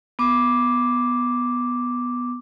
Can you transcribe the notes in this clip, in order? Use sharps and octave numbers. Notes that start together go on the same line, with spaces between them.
B3 D6